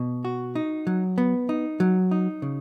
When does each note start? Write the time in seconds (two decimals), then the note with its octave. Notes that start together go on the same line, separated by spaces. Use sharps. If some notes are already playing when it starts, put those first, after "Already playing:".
Already playing: B2
0.25 F#4
0.55 D#4
0.87 F#3
1.18 B3
1.49 D#4
1.80 F#3
2.11 D#4
2.42 C#3